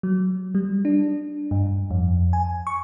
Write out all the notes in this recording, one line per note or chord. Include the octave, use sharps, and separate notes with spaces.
F#3
G3
D4
G2
F2
G#5
C#6